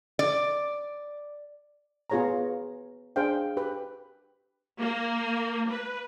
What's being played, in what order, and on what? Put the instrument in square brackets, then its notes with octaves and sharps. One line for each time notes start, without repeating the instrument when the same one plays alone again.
[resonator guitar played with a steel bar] D5
[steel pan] B3 F4 G#4 C#5 G#5 A#5
D4 G#4 C5 F5 G5
G4 B4 G5
[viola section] A#3
B4